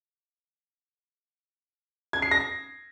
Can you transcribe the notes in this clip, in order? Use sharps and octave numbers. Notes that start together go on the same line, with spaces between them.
G#6
C7
A#6